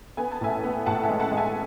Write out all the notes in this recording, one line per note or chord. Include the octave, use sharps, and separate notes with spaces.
B3 G#5
A5
A2 E5 G#5
B3
A2 F#5 A5
E5 G#5
G#3
F#5 A5
G#3
E5 G#5